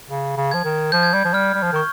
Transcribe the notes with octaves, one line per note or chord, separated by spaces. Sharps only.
C#3
C#3
F3 G#6
D#3
F3 G6
G#6
G3 G6
F3
G3 F6
G3
F3
D#3 C#6